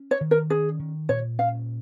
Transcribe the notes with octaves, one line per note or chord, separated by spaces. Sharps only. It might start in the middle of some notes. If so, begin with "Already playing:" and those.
Already playing: C#4
C#5
D#3
A#4
C#4 G#4
D#3
A#2 C#5
C#4 F5